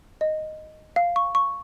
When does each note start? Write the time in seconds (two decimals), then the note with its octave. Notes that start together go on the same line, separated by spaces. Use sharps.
0.21 D#5
0.96 F5
1.16 C#6
1.35 C#6